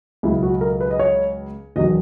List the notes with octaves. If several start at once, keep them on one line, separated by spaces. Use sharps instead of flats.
C#2 B2 F#3 E4
F#4
A#4
B4
D#5
C#5
E1 D#3 F#3 D#5